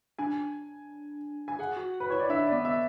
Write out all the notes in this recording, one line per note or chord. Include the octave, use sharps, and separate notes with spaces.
D4 G#5
G#5
G#4 F#5
F#4
F#4
B4
E4 C#5
D5
D4 E5
B3 D5
E5